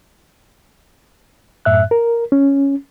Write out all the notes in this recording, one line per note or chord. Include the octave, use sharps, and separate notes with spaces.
F#2 A2 E5 F#6
A#4
C#4